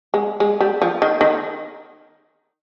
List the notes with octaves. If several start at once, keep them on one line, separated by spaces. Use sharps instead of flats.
G#3
G#3
G3
F3
D#3
D#3